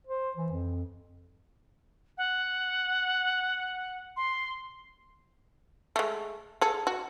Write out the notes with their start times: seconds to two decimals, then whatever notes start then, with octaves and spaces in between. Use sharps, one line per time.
0.07 C5
0.37 E3
0.52 F2
2.18 F#5
4.17 C6
5.96 G#3 A3
6.61 G#4 A4
6.87 F#4